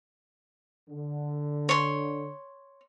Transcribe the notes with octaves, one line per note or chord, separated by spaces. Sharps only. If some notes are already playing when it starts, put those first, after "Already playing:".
D3
C#5 C6